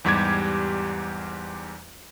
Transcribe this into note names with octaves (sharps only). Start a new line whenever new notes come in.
E2 G#2 G3 G4 D6 G#6